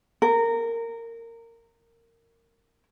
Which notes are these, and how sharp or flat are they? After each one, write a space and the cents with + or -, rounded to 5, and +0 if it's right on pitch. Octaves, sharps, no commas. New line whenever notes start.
A#4 -20